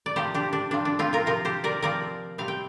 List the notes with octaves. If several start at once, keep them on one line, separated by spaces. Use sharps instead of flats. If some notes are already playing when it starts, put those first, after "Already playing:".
D5
C3 F3 C4 G4 C5
D4 G4
D4
C3 F3 C4 D4
D4
C4 F4
F4 A#4
C3 F3 C4 F4 A#4
G4 C5
A#4 D5
C3 F3 C4 A#4 D5
C3 G3 C4 F5
G5